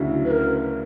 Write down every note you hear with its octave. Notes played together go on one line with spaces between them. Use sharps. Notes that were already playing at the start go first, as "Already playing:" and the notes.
Already playing: D2 C#3 F#3 C#4 E4
B4
A#4